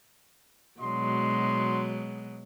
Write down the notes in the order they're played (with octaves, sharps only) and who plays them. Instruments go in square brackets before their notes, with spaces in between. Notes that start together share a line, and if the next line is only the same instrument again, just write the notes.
[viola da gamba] B2 F#3 G#3 [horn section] D4 D#5 C6